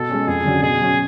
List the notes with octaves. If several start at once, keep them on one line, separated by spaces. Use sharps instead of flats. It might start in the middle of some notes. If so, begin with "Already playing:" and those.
Already playing: B2 A4
G#3 C#4
F2 G#4
D3 F#3 C#4 F#4
B2 G#4
F#3 C#4